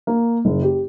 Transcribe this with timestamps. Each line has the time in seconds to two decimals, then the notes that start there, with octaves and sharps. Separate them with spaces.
0.07 A#3
0.45 F#1
0.62 G4